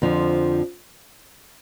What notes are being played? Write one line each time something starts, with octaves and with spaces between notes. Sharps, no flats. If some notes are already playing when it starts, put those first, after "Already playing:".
F2 D3 F3